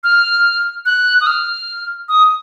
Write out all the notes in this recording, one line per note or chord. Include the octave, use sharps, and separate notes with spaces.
F6
F#6
D#6
F6
D#6